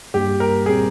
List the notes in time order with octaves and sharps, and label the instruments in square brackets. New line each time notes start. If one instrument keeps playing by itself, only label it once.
[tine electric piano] G2 G3 A#3 [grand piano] G4
[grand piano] A#4
[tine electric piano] A#2 G3 C4 [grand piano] G#4